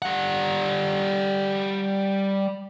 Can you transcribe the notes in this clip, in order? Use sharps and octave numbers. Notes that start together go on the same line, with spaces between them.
G3 F#5